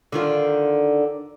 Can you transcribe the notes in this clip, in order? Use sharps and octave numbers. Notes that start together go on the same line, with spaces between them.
D3 D#3 F4